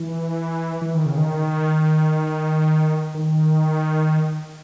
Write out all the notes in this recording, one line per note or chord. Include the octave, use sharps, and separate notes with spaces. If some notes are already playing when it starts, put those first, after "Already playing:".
Already playing: E3
E3
D#3
C#3
D#3
D#3